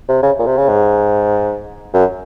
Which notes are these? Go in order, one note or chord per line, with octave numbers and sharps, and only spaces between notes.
C3
C#3
A#2
C3
C#3
G#2
F#2